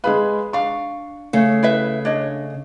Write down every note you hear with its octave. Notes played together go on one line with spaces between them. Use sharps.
G#3 G#4 B4 F5 B5
D4 F5 C#6
C#3 A3
E4 B4 E5
D4 C#5 D#5